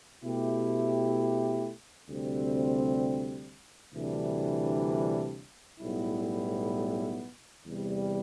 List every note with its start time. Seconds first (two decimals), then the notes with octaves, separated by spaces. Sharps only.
0.23 B2 A3 E4 G4
2.09 D2 C3 G3 C4
3.95 D2 C3 E3 G3 D4
5.80 B1 A2 G3 B3 E4
7.66 E2 C3 G3